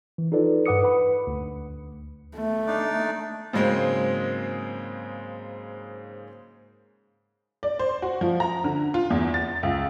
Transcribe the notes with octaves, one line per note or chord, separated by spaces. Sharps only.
E3
D#4 F4 A4 B4 D5
G2 B4 F#5 D6 D#6 C#7
B4 F#5 B5
D2
A3
D4 D#4 D5
G#2 C#3 F#3 G#3 A#3 C4
D5
C5
F#4
F3
A#5
D3
F4
E2
A6
C#2